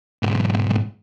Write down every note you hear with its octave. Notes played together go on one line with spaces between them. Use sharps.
B1 G#2